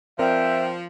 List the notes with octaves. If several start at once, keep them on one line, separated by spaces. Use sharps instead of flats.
F3 C4 A#4 D5 E5 G5